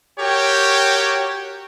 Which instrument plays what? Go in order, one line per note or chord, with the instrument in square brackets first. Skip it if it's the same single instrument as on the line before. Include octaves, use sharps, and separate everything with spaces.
[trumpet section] F#4 G4 A#4 C#5 G5